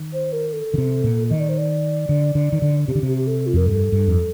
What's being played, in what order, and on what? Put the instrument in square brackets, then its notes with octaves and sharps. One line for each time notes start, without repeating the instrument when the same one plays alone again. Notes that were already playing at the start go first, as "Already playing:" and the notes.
Already playing: [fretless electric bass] D#3
[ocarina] C5
A#4
A4
[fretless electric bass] D3
C3
A#2
[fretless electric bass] D#3 [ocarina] D#5
[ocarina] D5
C5
D5
[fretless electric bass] D3
D3
D#3
D3
[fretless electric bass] C3 [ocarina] G4
[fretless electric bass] D3
[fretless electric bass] C3 [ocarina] G4
[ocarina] G4
A4
F4
[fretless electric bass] F2 [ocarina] A#4
[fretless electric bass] G2 [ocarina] A4
[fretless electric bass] G2
F2